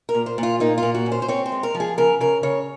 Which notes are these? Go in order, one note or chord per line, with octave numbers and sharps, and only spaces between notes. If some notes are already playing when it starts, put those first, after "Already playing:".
A#4
A#2
C5
A#2
F4
A#3 D#4
F4
A#2
F#4
C#4
C5
C5
C4 C#5
C5
G#3
A#4
F3
G#4
C#3 A#4
C#3 A#4
C#3 C#5